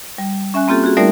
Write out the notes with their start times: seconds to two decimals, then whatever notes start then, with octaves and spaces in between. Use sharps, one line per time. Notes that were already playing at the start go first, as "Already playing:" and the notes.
0.18 G3
0.54 C#4 E5 G#5 F#6
0.68 A#3 C4 F4 G4 A4
0.84 F#4 G#4
0.97 G3 A3 D#4 A#4 D5 E5